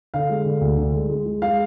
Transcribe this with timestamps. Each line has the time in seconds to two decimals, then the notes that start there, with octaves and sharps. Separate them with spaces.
0.14 D3 F5
0.29 G#3
0.45 D3
0.61 D2
0.78 D3
0.94 G#3
1.09 G#3
1.26 G#3
1.42 G#3 F5